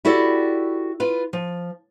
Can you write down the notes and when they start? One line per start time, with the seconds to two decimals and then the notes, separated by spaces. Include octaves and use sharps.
0.05 E4 F#4 G4 A4 D5
1.00 F4 B4
1.33 F3